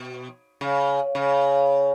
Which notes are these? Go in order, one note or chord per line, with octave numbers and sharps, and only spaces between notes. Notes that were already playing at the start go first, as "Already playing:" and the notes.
Already playing: B2
C#3
C#3